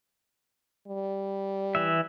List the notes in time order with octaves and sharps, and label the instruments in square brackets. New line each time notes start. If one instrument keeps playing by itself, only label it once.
[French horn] G3
[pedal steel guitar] E3 E5